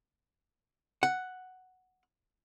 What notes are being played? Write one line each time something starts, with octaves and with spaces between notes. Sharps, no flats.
F#5